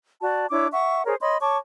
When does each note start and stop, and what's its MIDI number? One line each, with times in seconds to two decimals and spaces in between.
0.21 0.47 66
0.21 0.47 74
0.21 0.47 81
0.50 0.68 62
0.50 0.68 64
0.50 0.68 73
0.50 0.68 86
0.72 1.04 76
0.72 1.04 78
0.72 1.04 85
1.06 1.15 68
1.06 1.15 70
1.06 1.15 72
1.06 1.15 73
1.21 1.37 73
1.21 1.37 75
1.21 1.37 83
1.21 1.37 84
1.40 1.57 73
1.40 1.57 81
1.40 1.57 85
1.40 1.57 86